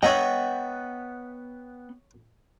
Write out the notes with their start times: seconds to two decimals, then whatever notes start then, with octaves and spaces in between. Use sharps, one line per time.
0.03 B3 C#5 D#5 E5 F#5 G5 A#5